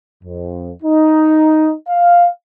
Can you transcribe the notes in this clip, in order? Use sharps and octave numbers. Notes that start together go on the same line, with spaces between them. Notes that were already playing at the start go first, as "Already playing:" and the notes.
F2
D#4
F5